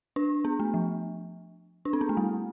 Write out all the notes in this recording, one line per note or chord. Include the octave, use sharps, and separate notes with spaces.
D4
B3
A3
F3
D4
C4
B3
A3
G3